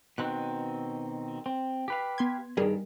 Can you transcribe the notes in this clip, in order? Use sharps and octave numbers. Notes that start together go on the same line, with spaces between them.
B2 D#3 C4 F#6
C4
G4 B4 F5
B3 C6 G#6
G2 D#3 G3 G#4 A#4